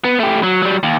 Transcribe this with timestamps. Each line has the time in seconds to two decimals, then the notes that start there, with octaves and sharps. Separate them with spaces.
0.04 B3
0.20 A3 G4
0.43 F#3
0.62 F#3 G3
0.83 D#2